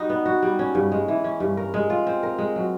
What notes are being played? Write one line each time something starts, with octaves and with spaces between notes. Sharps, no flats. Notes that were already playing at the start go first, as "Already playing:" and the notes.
Already playing: G3 D#4 F#4
B3
F#4
G3
C#4
G2
G#3
E3
C#4
G2
A#4
G#3
F4
C4
A#4
G#3
F#3